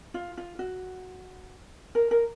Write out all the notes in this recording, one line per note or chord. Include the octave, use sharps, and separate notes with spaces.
F4
F4
F#4
A#4
A#4